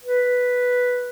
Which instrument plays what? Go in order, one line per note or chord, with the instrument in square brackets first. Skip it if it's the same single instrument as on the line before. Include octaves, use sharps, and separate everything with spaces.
[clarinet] B4